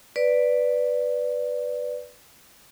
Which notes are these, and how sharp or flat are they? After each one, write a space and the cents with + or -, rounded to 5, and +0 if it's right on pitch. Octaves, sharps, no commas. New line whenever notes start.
B4 +0 D5 +0